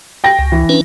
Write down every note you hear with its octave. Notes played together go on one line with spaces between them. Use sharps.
G5 A#6
C#2
E3
C#4 D4 B4